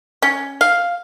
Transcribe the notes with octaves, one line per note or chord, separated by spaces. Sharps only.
C#4
F5